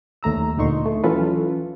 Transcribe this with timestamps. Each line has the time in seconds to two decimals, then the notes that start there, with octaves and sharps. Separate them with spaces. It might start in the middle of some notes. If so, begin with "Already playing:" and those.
0.23 D#2 A3 A#5 E6
0.57 D2 A#2 D3 D#4 C6 C#6
0.86 A3
1.04 E3 F#3 C#4 F4 A4 B4